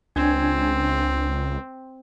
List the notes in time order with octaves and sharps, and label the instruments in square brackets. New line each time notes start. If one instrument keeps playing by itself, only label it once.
[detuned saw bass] C#2 [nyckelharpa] C4 [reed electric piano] D4 G#5 G#6